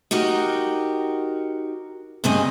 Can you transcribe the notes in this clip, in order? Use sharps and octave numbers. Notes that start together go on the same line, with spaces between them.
D#4 F#4 G4 A#4
G2 C#3 C4 D#4 D#5 G#5